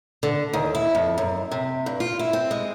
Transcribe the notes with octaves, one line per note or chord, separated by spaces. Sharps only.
D3
D#2
E4
F2
F#2
C3
G2
F4
E4
C4
G#3